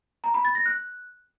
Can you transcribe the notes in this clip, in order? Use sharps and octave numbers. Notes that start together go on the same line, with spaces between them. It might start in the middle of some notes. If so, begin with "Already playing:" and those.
A#5
B5
A6
A#6
F#6